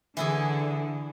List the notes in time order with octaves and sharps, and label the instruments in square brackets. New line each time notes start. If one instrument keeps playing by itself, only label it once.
[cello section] D3 [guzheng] E3 E4 G#4